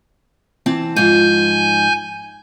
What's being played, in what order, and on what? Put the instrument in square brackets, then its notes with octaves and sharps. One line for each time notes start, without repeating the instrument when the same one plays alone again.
[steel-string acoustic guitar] E3 C4 A5
[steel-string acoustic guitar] G#2 F3 [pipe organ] G#5 G6